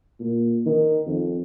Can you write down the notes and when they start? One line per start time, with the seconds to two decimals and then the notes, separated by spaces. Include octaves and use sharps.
0.20 A#2
0.66 D#3
1.06 F2